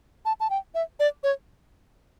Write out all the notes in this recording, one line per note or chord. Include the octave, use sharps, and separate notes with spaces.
A5
A5
G5
E5
D5
C#5